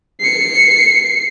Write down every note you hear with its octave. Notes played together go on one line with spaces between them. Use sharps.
C7 C#7